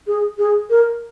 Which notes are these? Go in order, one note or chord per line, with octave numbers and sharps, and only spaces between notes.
G#4
G#4
A#4